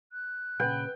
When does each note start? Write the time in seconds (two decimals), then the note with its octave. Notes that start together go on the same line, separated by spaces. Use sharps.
0.12 F#6
0.60 A#2 C#3 B4 G5